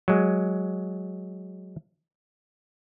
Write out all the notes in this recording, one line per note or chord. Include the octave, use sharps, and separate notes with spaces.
F#3 G#3